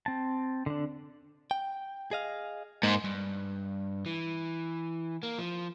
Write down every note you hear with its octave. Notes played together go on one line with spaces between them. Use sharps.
C4 A5
D3 D4
G5
G#4 D#5 F5
G#2 A#3
G2
E3
A#3
F3